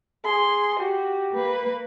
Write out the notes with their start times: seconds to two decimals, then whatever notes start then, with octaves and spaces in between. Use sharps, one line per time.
0.25 G#4 C6
0.79 F#4 G4
1.32 A#3 B4